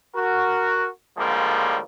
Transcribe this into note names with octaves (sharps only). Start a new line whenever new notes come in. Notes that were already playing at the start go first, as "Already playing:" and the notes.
F#4 A#4
A2 D3 F3 G3 G#3 A#3